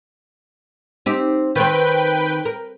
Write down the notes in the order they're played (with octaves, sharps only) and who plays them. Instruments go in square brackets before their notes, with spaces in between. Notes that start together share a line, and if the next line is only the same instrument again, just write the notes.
[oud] C4 D#4 G4
[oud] D#3 C4 [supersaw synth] B4 G5
[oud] A#4